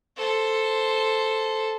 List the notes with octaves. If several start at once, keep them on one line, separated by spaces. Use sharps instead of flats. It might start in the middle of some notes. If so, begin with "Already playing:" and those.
A4 C5